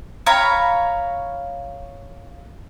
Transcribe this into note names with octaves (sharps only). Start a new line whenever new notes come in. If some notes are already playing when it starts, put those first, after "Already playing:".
C#5 F5 A#5 B5